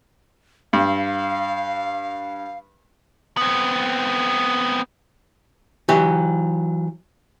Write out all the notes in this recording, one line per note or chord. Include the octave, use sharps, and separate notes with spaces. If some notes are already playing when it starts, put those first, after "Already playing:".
G2 F5
B3 C4
E3 F#3 G4